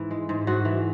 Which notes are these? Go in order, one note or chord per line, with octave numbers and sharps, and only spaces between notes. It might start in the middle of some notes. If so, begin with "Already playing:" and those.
Already playing: G#2 E3 E4
G#3
G#2
G#2 F#4
E3